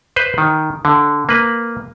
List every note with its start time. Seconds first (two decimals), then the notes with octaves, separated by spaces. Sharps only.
0.16 B4 C5
0.38 D#3
0.85 D3
1.29 A#3 B4